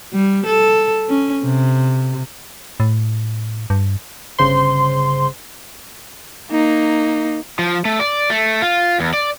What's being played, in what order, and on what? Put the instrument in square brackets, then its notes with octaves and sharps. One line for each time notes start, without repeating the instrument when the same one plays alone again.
[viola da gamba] G3
A4
C#4
C3
[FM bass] A2
G2
[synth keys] G1 C#3 C5 C6
[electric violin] A#3 D#4
[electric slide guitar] F3
A3
D5
A3
F4
E2
D5